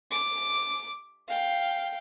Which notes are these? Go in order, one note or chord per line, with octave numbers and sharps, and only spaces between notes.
D6
F5 G5